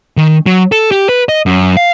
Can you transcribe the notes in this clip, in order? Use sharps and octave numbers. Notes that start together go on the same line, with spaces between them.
D#3
F#3
A4
G4
B4
D#5
F#2
F5